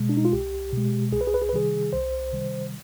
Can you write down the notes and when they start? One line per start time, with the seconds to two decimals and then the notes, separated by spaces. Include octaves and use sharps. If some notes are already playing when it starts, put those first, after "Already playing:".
Already playing: B2 G#3
0.09 D4
0.17 D#4
0.25 F4
0.32 C2 G4
0.73 B2 G#3
1.12 C2 G#4
1.21 B4
1.27 G#4
1.34 B4
1.42 G#4
1.49 B4
1.53 C3 D#3 G3 G#4
1.93 C2 C5
2.33 C3 D#3 G3